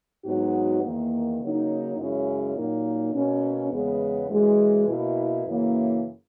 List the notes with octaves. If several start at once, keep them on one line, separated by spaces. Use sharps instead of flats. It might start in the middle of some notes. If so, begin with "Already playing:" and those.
G#2 F#3 B3 D#4 F#4
E2 D#3 A#3
C#3 F#3 A#3 D#4
F#2 C#3 G#3 C#4 E4
A#2 F#3 A#3 D#4
B2 A#3 C#4
E2 C#3 G#3 B3
F#2 E3 G#3
B2 A#3 E4
F#2 C#3 E3 A#3 E4